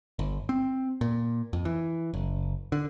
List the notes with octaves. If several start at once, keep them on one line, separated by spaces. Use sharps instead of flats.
G1
C4
A#2
F2
E3
F#1
D3